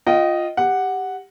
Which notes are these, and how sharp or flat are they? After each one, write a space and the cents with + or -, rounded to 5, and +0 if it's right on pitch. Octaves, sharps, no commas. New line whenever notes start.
F4 +0 D#5 +0 G5 -40
G4 +10 F#5 +0